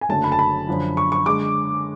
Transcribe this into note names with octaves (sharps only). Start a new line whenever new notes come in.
G#5
F#1 F#2 D3 F#3 A3 A5
B5
A5
B5
F#2 D3 F3
C#6
C#6
D3 G#3 D6